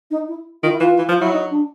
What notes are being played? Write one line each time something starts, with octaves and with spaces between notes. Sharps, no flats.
D#4
E4
D#3 F4
E4
E3 F4
E3
F3 F4
F#3 E4
D#4
D4